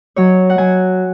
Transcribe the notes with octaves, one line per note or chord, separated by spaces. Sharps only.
F#3 C#5
F#5
F#3 G#5